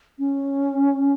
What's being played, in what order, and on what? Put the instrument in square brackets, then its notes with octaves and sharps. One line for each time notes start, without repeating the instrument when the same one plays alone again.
[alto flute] C#4